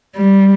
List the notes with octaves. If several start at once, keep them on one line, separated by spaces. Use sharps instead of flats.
G3